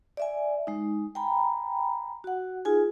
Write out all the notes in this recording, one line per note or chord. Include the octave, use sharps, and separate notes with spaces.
D5 E5 G#5
G#3 D#4
G5 G#5 A#5 B5
F#4 F#5
D#4 F4 G#4 G#5